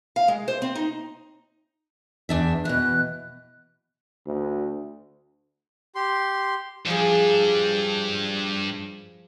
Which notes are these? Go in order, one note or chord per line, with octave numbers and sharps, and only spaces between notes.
F5
G#3
C5
C4
D#4
E2 D4 E5
B2 E3 F#6
D2
G4 C6
G2 F3 D4 G#4